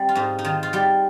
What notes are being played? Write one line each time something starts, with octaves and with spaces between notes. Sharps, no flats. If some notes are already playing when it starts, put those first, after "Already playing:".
Already playing: G3 C4
F4
G#2 D#4
D#4
D#3 F4
F4
G3 G4